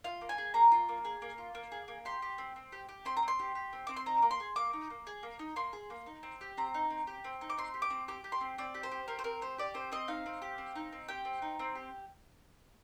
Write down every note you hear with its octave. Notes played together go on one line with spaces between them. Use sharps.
F4 F5
A#3
G#5
G#4
A#3 A#5
F4
A#3
G#4
A#3
F4
A#3
G#4
A#3
G4 C6
G4
C4
C4
G4
G4
C4 C6
A#5
C4
C6
G4
G4
C4
C4 D6
C6
D#4 A#5
A#3
C6
G#4
A#3 D6
D#4
A#3
G#4
A#3
D#4
A#3 C6
G#4
A#3
D#4
C4
G4
C4 A#5
D#4
C4
G4
C4
D#4
D6
C4 C6
G4
D6
C4
G4 D6
G4
C6
C4
C4 D5
G4
C5
G4
C4 A#4
C5
C4 A#4
G4 C5
G4 D5
C4 C5
C4 D#5
D#4 F5
C4
G4
C4
D#4
C4
G4 G5
C4
D#4
C4
G4